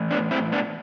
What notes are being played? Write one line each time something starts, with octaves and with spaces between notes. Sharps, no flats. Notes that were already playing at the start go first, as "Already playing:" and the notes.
Already playing: A2 E3
B3 D4
C4 E4
B3 D4